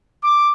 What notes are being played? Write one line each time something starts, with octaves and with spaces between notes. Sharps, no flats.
D6